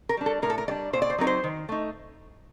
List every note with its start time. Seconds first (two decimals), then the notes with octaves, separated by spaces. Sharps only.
0.09 A#4
0.17 G3 D4
0.26 A4
0.42 A2 A#4
0.50 A4
0.58 A#4
0.68 G3 D5
0.71 D4
0.93 A#2 C5
1.02 D5
1.10 C5
1.18 F#3 C4 D#4 A#4
1.27 C5
1.44 D#3
1.69 A3 D#4